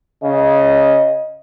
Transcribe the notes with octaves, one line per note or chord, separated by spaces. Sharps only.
C#3 D#5